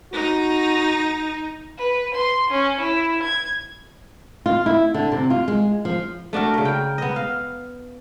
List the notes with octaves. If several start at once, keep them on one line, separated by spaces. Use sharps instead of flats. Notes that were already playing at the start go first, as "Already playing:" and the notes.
D#4 F#4
B4
C6
C#4
E4
G#6
F4
E4
D3
C3
F4
G#3
F3
A3 D4 F#4 A#4
C#3 A#4
G5
B3 D#5
F5